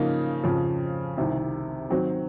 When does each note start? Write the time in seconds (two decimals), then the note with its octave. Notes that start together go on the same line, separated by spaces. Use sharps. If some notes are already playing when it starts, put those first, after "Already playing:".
Already playing: C#3 F3 A#3 D#4
0.44 F2 C#3 F3
1.17 C2 C3 D#3
1.89 D#3 F#3 C4